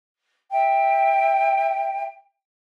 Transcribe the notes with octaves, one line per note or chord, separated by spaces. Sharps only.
E5 G5